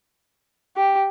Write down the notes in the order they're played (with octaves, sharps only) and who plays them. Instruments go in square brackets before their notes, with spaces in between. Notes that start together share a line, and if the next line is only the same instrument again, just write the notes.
[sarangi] G4